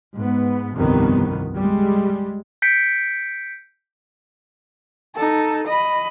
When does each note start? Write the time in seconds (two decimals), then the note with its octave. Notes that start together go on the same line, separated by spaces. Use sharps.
0.14 G#2 B3
0.74 G1 C2 F2 D#3 B3
1.57 G3 G#3
2.62 G6 B6 C#7 D7
5.16 D#4 A4
5.67 D#5 B5